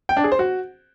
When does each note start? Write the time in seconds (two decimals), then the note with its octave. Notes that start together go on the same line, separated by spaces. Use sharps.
0.09 G5
0.17 D4
0.24 G#4
0.32 C5
0.39 F#4